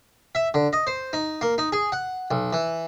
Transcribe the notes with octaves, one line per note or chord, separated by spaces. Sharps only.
E5
D3
D#5
C5
D#4
A#3
D#4
G#4
F#5
B1
E3